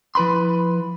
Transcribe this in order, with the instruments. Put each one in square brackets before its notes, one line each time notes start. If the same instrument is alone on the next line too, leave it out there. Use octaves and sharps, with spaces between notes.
[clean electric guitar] F3 E4 B4 B5 C6